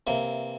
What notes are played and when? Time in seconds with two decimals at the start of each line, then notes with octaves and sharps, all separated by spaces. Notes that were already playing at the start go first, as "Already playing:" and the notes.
0.07 C3 E3 A#3